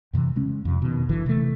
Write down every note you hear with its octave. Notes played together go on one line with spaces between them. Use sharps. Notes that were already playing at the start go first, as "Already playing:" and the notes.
F#2 C3 D#3 E3
C#3 G#3 C#4
F2 C3
B2 D#3
F#1 D3 E3
C3 E3 F#3 A3